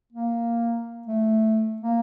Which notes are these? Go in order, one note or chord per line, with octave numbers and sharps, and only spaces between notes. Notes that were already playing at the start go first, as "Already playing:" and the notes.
A#3
A3
A#3